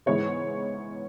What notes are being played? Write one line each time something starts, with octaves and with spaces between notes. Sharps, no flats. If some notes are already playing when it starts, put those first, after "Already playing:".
G#2 E3 G#3 B3 C#5